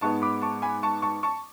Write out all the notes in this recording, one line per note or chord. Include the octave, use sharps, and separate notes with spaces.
G#2 G#3 B3 A5 C#6
B5 D6
A5 C#6
G#5 B5
A5 C#6
A5 C#6
A5 C#6